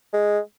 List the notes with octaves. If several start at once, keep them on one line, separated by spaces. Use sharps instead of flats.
G#3